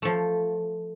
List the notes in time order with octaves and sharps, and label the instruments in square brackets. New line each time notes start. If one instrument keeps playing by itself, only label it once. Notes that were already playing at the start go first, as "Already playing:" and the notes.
[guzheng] F3 A3